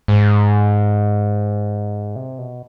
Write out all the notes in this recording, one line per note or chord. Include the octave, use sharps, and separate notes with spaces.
G#2
C3
B2